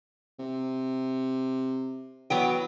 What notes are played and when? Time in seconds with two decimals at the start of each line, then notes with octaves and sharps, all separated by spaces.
0.39 C3
2.30 E3 F#3 B3 G5